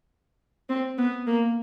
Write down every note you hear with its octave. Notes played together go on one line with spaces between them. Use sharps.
C4
B3
A#3